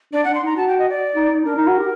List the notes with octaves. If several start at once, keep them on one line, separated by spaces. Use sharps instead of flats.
D4 D5
D4 F#5
C6
D#4 A#5
F#4 A5
G5
D#5
D5
D#4
D#4
D4 A#4
D#4
F#4
G4